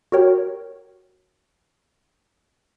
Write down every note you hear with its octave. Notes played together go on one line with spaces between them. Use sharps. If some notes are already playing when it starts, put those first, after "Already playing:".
F#4 G4 A#4 C#5 G5